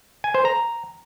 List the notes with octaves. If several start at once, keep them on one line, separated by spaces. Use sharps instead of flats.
G#5
C5
A#5